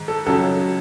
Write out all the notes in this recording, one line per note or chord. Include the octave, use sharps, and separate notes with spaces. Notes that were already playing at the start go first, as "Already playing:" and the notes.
Already playing: G#2 D#3
A4
C#2 C#3 F#3 A4